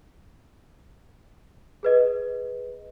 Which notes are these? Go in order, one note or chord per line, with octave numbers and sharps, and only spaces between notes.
G#4 B4 D#5